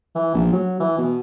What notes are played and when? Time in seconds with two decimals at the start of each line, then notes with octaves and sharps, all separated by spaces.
0.15 E3
0.35 A#1
0.53 F#3
0.80 E3
0.98 B2